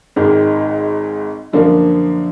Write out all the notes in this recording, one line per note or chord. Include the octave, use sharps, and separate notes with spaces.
G#1 G#2 D#3
F#2 D3 F3 A#3